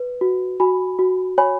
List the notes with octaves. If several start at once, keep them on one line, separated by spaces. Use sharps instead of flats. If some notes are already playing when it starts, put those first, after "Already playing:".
Already playing: B4
F#4
F#4 G#5 B5
F#4
C#5 G#5 B5